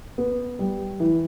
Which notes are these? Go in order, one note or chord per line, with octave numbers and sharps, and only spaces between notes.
B3
G3
E3